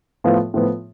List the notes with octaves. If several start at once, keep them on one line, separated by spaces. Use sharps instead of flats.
A2 F3 B3 F4
A2 F3 B3 F4